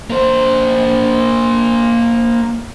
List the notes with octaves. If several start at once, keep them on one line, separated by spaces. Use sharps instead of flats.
A#3 C5